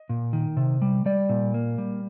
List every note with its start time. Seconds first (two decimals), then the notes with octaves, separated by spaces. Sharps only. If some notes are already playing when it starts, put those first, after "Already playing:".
Already playing: D#5
0.09 A#2
0.33 D#3
0.57 C3
0.82 G3
1.06 G3 D5
1.29 A#2
1.54 A#3
1.78 G3